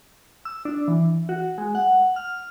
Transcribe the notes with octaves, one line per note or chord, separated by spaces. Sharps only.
E6
D4
E3
F#4
G#3
F#5
F6